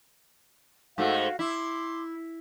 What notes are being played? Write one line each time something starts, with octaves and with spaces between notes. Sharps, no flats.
G#2 A3 F#4 F5
E4 C6 D6